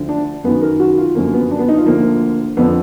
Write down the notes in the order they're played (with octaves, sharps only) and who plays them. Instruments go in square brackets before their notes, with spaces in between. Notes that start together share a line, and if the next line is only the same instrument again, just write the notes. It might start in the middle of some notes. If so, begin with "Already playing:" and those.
Already playing: [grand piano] D2 D3 F3
D4
F#2 D#3 B3
A#4
F#4
F4
F#2 D3 F3 A#3
B3
D4
B3
D#4
F4
D2 D3 F3 A#3
F2 D3 F3 B3